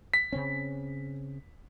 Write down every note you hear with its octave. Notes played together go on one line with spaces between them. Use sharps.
B6
C#3 C4 C#4